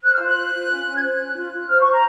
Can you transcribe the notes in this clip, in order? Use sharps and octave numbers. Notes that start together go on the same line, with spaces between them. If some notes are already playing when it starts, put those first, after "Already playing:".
C5 F#6
F6
F4
F#6
C5
F4
C#4
C#4
G#6
C5 F#6
C#4
F4
F4
C5 F6
C#6
C5
A#5